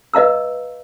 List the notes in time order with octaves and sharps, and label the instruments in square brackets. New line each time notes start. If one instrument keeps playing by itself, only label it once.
[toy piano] B4 D#5 F5 A#5 E6